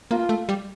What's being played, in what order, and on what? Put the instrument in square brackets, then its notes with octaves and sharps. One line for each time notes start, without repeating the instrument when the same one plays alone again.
[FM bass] A#3 [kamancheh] F4
[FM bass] A3
G3